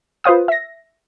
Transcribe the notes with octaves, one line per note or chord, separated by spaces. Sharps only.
F4 B4 C5 F5 D#6
E5 A#6